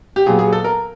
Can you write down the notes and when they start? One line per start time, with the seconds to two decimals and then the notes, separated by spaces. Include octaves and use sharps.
0.16 G4
0.26 A#2 F#3 B3 G#4
0.39 G#4
0.53 A4
0.64 A#4